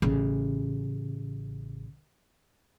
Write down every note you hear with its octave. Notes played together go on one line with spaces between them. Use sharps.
A1 C#3